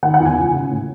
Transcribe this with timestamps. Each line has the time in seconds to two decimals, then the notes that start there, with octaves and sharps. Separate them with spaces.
0.03 D#3 F#5
0.14 F#5
0.20 E2
0.25 G#5
0.36 C#2
0.54 C#3
0.71 A2